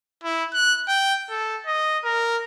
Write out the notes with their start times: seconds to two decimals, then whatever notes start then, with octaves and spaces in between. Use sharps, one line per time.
0.24 E4
0.53 F#6
0.88 G5
1.30 A4
1.66 D#5
2.04 A#4